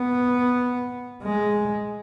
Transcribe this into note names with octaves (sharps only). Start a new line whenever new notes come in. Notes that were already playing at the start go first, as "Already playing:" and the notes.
Already playing: B3
G#3